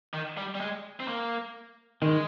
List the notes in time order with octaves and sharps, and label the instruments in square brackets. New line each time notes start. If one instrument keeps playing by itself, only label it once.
[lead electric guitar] D#3
G3
G3
G#3
C4
A#3
[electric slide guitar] D#3 [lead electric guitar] G#3